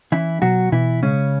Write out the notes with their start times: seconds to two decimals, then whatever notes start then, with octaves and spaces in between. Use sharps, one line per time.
0.12 E3 C#4 E4
0.42 B2 F#3 F#4
0.72 B2 E3 E4
1.03 C#3 G#3 C#4